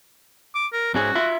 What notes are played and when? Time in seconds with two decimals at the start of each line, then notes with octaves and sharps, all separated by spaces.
0.55 D6
0.73 A#4
0.94 G#2 C#4 F#4 G#4
1.15 F4 E5